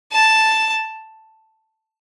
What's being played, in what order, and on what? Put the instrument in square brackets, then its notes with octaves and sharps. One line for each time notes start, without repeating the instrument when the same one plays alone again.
[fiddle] A5